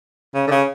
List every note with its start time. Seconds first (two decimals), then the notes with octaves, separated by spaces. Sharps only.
0.35 C#3
0.47 D3
0.51 C#3